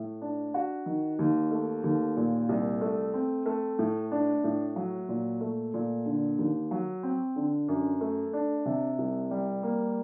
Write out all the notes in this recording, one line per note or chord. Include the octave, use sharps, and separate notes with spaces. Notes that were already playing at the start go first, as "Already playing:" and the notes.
Already playing: A2
D4
F#4
D#3
D#2
A3
D#2
A#2
C2
A3
C4
A3
A2
D4
A2
F#3
A#2
A3
A#2
D3
D#2
F#3
C4
D3
F#2
A3
D4
C3
C2
G3
A#3